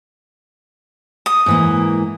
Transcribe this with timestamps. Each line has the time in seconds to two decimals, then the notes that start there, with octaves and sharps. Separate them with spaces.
1.26 D#6
1.46 G#2 E3 A#3